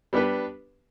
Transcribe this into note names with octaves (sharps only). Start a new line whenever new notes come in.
G3 B3 D4 G4 B4